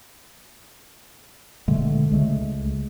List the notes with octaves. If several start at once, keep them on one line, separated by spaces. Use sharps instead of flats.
B2 D3 G#3 A3
C#2 G#3 A3